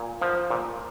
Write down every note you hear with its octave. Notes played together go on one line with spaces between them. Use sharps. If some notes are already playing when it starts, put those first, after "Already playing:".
Already playing: A#2 G#5
F3
A#2